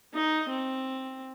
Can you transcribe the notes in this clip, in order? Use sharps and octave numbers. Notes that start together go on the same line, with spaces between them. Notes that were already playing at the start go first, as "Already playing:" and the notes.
D#4 D#5
C4